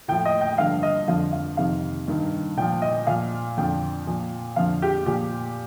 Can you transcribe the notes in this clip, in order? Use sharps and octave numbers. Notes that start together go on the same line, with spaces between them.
A2 F3 G5
D#5
G5
G2 D3 F3 F5
D#5
F2 D3 F3 F5
F5
F2 C3 D#3 F5
G2 D#3
A#2 F3 G5
D#5
A#2 F3 F5
F2 D3 F3 G5
A#2 F3
F2 D3 F3 F5
G4
A#2 F3 G4